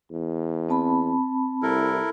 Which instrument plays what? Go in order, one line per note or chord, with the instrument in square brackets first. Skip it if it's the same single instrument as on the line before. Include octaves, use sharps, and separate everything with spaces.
[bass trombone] E2
[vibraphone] C4 A5 B5
[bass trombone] C2 [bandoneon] E4 A4 A#4